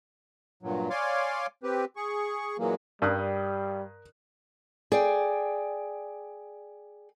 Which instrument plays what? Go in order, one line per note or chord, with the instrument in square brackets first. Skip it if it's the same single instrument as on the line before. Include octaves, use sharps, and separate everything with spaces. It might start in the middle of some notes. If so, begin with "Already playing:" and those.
[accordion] G2 A#2 F#3
C#5 D5 F5 G#5 C6 D6
C4 G4 B4
G#4 C#6
A#2 E3 F#3 G#3 A#3
[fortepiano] G2 [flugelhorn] G3 [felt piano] A#4 D#6 F#6
[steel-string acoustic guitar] G#4 D5 G5